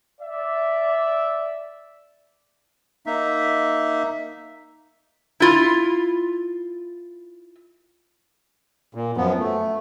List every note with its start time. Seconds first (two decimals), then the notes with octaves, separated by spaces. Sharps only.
0.21 D5 E5
3.06 A#3 D#4 E5
5.40 E4 F4
8.95 A#2
9.17 F#2 F3 B3
9.40 A3